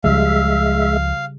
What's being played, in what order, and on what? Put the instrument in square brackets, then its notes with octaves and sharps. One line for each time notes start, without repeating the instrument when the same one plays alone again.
[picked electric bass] C#2 F3 [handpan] C#3 G3 [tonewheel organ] G#3 E5 [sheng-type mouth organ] F5